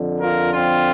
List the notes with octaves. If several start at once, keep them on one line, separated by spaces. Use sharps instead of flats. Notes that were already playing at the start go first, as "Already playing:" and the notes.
Already playing: F2 D3
F4 A#4
C4 F4